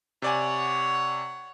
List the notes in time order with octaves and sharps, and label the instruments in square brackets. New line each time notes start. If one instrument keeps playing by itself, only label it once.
[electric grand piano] C3 D5 G#5 [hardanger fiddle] C#5 F#5